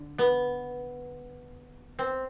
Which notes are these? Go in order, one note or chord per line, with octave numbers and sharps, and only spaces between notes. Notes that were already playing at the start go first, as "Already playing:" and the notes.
Already playing: D3
B3
C4